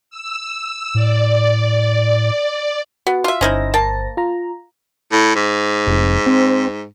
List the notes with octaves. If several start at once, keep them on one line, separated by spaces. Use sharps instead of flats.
E6
A2 D5
B3 F#4 F#5
F4 E5
G1 C#4 D#4 E4 C5 A#6
A#3 A5
F4 A#5
A2
G#2
F1
C4